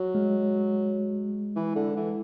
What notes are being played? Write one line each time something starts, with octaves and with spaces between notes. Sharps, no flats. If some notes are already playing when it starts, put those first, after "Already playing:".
Already playing: F#3
G#3
E3
D3
E3